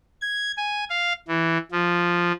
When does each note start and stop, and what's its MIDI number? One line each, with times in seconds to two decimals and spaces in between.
0.21 0.52 92
0.57 0.84 80
0.90 1.13 77
1.28 1.58 52
1.72 2.32 53